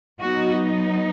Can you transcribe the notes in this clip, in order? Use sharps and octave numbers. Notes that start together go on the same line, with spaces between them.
F#3 B3 D#4 F#4